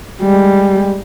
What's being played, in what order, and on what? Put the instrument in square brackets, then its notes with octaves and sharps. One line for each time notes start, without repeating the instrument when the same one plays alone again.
[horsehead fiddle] G3 G#3